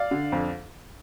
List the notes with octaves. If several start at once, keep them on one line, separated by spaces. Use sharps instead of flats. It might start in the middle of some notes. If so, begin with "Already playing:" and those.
Already playing: D5 F5
D3
F2